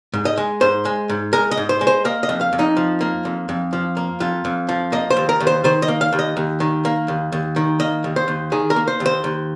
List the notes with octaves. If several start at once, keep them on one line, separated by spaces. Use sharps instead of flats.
G#2
D#5
G#3
G#2 C5
G#3
G#2
G#3 A#4
D#5
G#2
C5
G#3
C5
A#3 D#5
D#5
F2
F5
F2
D#4
F3
A#3
F2
F2
F3
A#3
F2 F4
F2
F3
A#3 D#5
C5
D#2
A#4
D#2
C5
D#3 C5
D#5
A#3
F5
D#2
D#5
D#2
D#3
A#3
D#2
D#2
D#3
A#3 D#5
D#2
C5
D#2
D#3 G#4
A#4
A#3
C5
D#2
C5
D#2